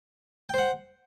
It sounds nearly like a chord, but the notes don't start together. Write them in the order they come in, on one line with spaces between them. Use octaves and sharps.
G5 C5 F#5